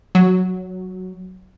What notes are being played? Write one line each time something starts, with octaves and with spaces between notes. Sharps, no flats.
F#3